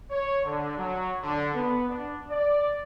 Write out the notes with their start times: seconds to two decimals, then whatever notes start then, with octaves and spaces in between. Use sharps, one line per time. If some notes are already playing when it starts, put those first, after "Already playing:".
0.11 C#5
0.45 D3
0.78 F#3
1.23 D3
1.55 B3
1.89 D4
2.31 D5